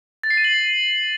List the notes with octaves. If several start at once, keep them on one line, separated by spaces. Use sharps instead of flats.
A6
C7
D#7
F#7